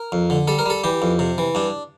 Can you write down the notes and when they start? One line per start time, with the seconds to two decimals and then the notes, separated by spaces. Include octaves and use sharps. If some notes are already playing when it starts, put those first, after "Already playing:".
Already playing: A#4
0.12 F2
0.30 D3
0.48 G3 A4
0.59 A#4
0.66 G3 A4
0.84 E3 G4
1.02 F2
1.19 C3
1.38 E3
1.55 G2 D4